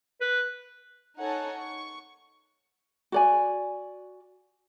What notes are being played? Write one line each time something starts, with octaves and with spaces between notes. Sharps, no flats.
B4
D#4 A4 C#5 F#5 G#5 A5
C#6
F#4 D5 G#5